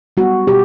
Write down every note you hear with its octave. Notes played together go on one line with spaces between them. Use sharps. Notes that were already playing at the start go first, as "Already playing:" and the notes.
G3 B3 F#4
B2 G4